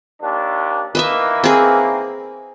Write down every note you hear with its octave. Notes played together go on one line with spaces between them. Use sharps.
D#2 D4
D#3 E3 A#3 B4 D#5 E5
C4 G#4